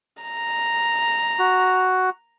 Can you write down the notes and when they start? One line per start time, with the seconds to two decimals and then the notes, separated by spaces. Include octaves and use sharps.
0.22 A#5
1.39 F#4